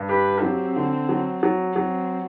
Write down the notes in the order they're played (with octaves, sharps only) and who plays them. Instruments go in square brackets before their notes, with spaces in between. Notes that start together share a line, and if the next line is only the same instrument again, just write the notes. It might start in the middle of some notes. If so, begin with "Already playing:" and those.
Already playing: [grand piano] G2
[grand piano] G4 [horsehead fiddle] B4
[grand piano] F#3 [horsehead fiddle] C4
[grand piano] D3
F#3
F#3
[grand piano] F#3 [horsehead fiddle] C4